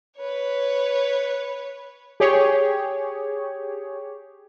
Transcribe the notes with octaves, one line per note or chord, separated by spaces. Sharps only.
B4 C#5
G4 G#4 C#5